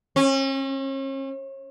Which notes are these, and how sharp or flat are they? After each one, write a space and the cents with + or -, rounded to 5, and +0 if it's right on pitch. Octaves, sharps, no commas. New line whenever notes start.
C#4 -40